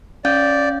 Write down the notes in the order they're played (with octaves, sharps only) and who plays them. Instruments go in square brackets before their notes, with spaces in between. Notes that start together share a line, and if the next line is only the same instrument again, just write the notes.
[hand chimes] C#4 F5 G6 [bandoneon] D5